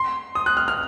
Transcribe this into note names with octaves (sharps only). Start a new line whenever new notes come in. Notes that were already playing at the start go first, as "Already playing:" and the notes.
Already playing: C6
D#6
F#6
F6
F6